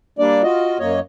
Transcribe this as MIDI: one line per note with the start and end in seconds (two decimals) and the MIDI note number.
0.19 0.42 55
0.19 0.42 58
0.19 0.42 62
0.19 0.42 74
0.43 0.78 65
0.43 0.78 66
0.43 0.78 75
0.79 1.00 42
0.79 1.00 58
0.79 1.00 73
0.79 1.00 75